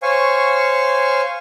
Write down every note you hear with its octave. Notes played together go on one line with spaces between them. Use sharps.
C5 C#5 F5 G#5 C#6